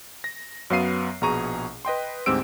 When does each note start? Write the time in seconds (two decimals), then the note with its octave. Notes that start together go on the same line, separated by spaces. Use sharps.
0.24 A#6
0.70 F#2 F#3 B3 F5 C7 D#7
1.21 A#1 B2 G#4 A#5 C#6 D#7
1.85 B4 D#5 G5 C6
2.26 D2 G#2 C4 G4 E6 D7